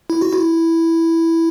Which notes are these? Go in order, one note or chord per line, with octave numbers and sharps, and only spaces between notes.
E4
F#4
E4